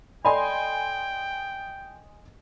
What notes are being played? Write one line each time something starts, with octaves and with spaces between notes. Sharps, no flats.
A4 D5 D#5 G5 G#5 B5 C6